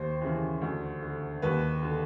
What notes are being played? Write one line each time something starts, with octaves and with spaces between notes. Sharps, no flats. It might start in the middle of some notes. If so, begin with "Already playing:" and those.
Already playing: D#2 C5
C#3 E3
D2
D3
D#2 B4
D3